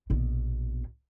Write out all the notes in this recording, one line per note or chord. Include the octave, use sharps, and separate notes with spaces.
A#1 B2